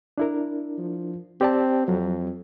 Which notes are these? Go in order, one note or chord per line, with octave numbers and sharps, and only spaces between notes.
D4 E4 A#4
F3
C4 G4 D5 A5
F2 F#3